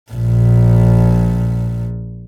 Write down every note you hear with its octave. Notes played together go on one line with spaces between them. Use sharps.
A#1 A#2